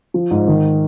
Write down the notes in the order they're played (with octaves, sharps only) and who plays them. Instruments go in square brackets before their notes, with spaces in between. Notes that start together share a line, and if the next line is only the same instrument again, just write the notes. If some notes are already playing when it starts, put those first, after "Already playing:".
[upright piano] F3
G#2
D#3